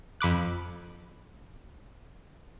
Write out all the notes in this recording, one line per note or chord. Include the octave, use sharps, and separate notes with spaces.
F2 B5 D6 F#6